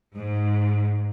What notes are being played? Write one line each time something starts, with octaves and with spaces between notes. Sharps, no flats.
G#2